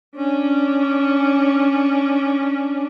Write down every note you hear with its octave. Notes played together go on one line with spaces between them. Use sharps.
C#4 D4